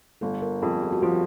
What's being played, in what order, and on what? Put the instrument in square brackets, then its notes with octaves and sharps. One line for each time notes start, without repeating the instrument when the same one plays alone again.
[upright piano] G1 [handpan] A4
[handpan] A#4
[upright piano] F2 [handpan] G#4
[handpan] G4
F#4
[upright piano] F3 [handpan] G4